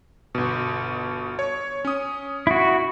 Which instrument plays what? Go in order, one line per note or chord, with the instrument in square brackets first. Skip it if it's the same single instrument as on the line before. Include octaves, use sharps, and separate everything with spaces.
[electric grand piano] G1 B2
C#5
C#4 D#6
[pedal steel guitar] E4 F#4